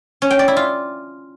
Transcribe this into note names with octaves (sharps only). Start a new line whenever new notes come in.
C#4
G5
D5
E4
F4